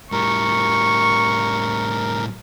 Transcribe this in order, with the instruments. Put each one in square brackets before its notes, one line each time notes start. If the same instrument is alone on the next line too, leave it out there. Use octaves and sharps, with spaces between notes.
[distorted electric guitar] A2 G3 [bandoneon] A#4 [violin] C#6